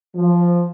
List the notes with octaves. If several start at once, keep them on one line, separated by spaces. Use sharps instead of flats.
F3